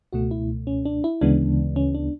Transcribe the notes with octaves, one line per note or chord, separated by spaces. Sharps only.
C#2 B2 A3 F#4
E4
C#4
D4
E4
D2 C#3 E3 G#3 B3 D4
C#4
D4